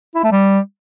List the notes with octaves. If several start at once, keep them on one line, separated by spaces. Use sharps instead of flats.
E4
A3
G3